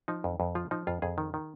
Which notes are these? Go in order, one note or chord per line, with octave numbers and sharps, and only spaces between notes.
F3 D#4
F2
F2
F3 F4
F3 D#4
F2 F4
F2 G#4
D#3
D#3